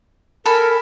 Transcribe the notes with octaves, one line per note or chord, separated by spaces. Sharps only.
A4 A#4 G#5 B5